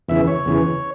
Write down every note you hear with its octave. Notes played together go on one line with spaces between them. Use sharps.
E2 C#3 E3 E5
C#5
E2 C#3 E3